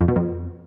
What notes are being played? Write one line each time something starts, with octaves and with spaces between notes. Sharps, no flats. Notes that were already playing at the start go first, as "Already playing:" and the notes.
F2
B2
F2